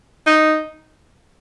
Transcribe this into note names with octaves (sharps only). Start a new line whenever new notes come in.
D#4